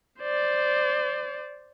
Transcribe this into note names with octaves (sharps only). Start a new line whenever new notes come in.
C5 D5